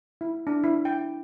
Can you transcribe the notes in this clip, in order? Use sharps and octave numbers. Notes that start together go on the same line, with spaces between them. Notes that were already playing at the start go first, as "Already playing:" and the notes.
E4
D4
E4
G5